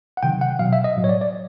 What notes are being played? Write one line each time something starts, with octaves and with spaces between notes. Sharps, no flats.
F#5
C3 D#3 F#3 G5
F#5
B2 F#3 F5
E5
D#5
A2 F#3
C#5
D5
D5